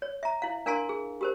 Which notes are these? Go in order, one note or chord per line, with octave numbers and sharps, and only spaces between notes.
C#5
E5 A#5
E4 F5
D4 A#4 F5 G#5 A#5 C6
G#4
G4 A#4 C5